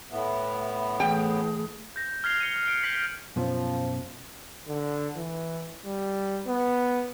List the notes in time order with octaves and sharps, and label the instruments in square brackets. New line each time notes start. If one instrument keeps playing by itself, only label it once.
[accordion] A2 B3 [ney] E5
[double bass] E3 A3 [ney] G#4 [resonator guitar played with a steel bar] G5
[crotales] G6 A#6
F6 G#6 B6 C7 F7 G7
C#7 D#7
D7
G6 B6 F#7
[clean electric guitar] F#2 B2 C#4 [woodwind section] F3
[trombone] D3
E3
G3
B3